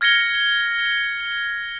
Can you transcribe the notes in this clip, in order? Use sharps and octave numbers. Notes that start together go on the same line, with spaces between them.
F6 G#6 A#6 C#7 G7